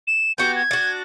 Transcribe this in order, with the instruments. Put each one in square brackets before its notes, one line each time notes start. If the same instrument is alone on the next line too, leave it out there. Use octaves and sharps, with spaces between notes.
[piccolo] E7
[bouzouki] B3 F#4 G4 [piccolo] G6
[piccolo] G#6
[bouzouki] D4 F#4